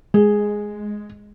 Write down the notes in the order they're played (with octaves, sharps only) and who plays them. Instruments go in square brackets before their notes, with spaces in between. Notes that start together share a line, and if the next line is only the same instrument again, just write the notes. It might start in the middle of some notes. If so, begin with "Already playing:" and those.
[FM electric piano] G#3 [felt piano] G#4